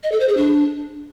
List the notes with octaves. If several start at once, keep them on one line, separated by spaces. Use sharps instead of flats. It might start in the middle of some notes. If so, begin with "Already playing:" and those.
D#5
A4
C5
G#4
D4